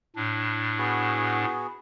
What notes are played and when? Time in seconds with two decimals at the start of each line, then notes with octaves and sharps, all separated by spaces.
0.16 A2 D4
0.78 B3 F#4 G#4